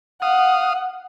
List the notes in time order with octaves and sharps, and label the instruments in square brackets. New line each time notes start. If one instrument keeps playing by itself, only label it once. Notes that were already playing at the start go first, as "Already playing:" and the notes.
[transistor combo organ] F5 D#6 [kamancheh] F#5